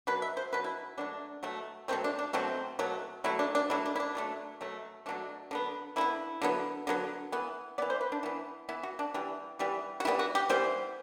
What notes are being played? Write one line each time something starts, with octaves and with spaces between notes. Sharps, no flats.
B2 F#3 B4
E5
C5
B2 F#3 B4
E4
B2 F#3 A3 D4
B2 F#3 A3
B2 F#3 A3 C4
D4
D4
B2 F#3 A3 C4
B2 F#3 A3
B2 F#3 A3 E4
D4
D4
B2 F#3 A3 E4
D4
E4
D4
B2 F#3 A3
B2 F#3 A3
B2 F#3 A3 D4
D3 F#3 B3
D3 F#3 B3 E4
D3 F#3 B3
D3 F#3 B3
E3 B3
E3 B3 D5
C5
B4
D4
E3 B3 E4
E3 B3 E4
F#4
D4
E3 G3 B3
E3 G3 B3
F#4
E3 G3 B3 E4
F#4
G4
E3 G3 B3 C5